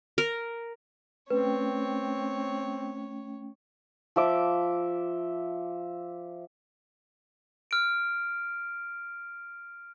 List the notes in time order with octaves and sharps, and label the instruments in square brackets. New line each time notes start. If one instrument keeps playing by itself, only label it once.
[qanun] A#4
[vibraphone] A3 C#4 G5 [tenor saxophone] C4 [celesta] B4 [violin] C#5
[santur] F3 E5 D6
[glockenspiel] F6 D7